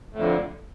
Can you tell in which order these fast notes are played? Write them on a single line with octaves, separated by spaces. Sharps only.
A2 F2 D3